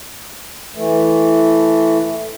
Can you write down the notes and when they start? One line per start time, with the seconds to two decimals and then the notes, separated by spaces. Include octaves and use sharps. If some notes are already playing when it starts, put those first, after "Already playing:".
0.75 E3 A3